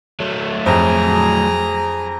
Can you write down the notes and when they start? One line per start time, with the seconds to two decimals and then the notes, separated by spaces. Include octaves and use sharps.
0.20 F#3 A3
0.66 F2 G#4 A#5